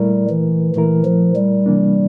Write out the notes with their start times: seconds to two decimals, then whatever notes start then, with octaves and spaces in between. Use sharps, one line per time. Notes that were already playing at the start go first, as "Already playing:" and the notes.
Already playing: A#2 G3 A3 E4 A#4
0.30 E3
0.75 A#2 E3 A3 E4 A#4
1.05 F3
1.36 G3
1.66 C3 E3 A#3 D4